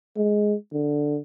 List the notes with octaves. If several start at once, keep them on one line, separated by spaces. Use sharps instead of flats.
G#3
D3